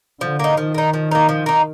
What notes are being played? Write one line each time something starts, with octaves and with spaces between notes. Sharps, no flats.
D3 F3
A#3 D#4
D#3 F3
A#3 D#4
F3
A#3 D#4
F3
A#3 D#4